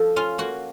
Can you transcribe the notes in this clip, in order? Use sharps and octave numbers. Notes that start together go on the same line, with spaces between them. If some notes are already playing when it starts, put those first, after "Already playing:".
Already playing: F3 A4
C#4 F4
A#3 F#4